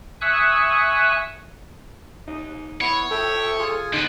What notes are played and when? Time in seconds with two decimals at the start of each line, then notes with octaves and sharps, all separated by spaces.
0.21 E5 G#5 C#6 D#6 E6 F#6
2.28 D#4
2.81 B3 E4 C#5
3.11 A4 E5 G5
3.59 F4 G#4 G#5
3.93 D3 B3 D#4